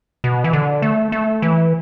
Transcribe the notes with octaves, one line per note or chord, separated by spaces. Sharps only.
B2
E3
D3
A3
A3
E3